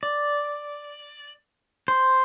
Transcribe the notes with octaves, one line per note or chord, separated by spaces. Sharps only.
D5
C5